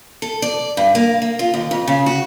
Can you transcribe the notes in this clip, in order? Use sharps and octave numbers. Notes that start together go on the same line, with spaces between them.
A4
D5
G2
A#3
A#3
F4
D#2
F2
C#3
F#4